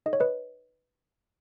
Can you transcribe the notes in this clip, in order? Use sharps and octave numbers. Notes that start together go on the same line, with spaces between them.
D#4 A4 D#5
C#5
B4 D#5